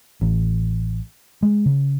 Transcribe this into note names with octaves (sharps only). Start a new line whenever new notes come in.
A1
G#3
C#3